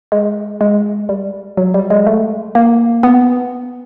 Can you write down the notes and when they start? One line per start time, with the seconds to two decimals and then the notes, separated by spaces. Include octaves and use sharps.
0.12 G#3
0.61 G#3
1.09 G3
1.57 F#3
1.74 G3
1.90 G#3
2.07 A3
2.55 A#3
3.03 B3